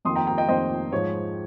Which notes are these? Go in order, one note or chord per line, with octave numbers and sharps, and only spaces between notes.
F2 D#3 A#3 C6 D#6
G5 A#5
G5 A#5
D#5 G5
F2 D#3 A#3 C5 D#5
G#2 F3 G#3 C#5